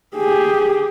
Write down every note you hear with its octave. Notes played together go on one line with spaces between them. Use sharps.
G4 G#4